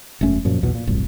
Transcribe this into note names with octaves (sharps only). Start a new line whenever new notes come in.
E1 F#2 A3 C#4
F#2 A#2 F3
B1 E2 B2
A#2
D1 G1 C2